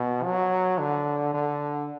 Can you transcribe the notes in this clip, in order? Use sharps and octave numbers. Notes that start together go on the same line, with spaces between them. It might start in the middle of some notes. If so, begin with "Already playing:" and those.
Already playing: B2
F#3
D3
D3